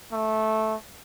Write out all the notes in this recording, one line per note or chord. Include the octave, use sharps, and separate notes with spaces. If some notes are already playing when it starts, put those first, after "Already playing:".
A3